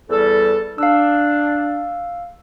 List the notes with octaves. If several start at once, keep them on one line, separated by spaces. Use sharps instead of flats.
E2 G3 A4
D4 F5 E6